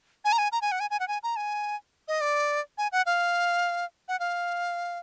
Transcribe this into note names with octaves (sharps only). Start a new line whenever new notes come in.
G#5
A#5
G#5
A#5
G#5
F#5
G#5
G#5
F#5
G#5
A#5
G#5
D#5
D5
G#5
F#5
F5
F#5
F5